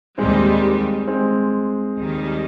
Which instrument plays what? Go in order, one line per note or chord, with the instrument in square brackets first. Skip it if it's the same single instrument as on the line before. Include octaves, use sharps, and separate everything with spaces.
[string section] D#2 D#3 G3 [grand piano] G#3 C4
[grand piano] G#3 C4
[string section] D#2 D#3 G3